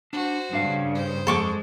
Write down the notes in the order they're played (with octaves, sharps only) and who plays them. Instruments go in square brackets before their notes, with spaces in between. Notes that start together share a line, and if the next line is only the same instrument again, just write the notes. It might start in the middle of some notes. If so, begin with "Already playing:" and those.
[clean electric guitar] D4 [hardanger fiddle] F#4 C5
[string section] G2 C#3 [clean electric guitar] D4 F5
[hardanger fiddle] C5
[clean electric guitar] F2 [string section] G#3 [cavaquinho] A4 C#6 D6